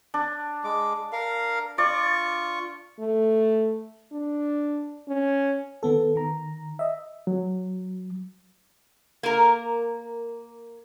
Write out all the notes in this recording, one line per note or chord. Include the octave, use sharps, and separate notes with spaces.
D4
G#3 D6
A#4 F5
F4 D5 C#6
A3
D4
C#4
D#3 B3 A4
D#3 A#5
D#5 E5
F#3
A#3 A#4